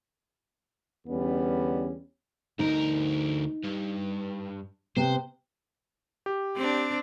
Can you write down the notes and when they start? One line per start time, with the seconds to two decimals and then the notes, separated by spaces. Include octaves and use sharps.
1.07 E2 D3 G3 B3 C#4
2.59 D2 D#4 A#4
3.64 G2
4.96 C3 B3 C5
6.26 G4
6.56 C4 D4